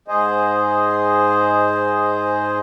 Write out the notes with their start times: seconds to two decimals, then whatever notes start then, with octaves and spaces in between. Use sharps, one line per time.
0.08 G#2 G#4 C5 D#5